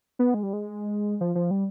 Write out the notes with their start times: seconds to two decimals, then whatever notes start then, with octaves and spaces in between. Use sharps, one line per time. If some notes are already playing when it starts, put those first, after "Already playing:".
0.19 B3
0.34 G#3
0.43 G3
0.53 G#3
1.21 F3
1.35 F3
1.51 G3